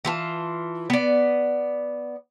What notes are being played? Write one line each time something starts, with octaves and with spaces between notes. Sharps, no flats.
E3 F4 A5
B3 D5